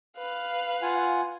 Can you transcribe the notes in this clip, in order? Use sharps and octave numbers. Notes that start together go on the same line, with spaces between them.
B4 F5
F4 F#5 G#5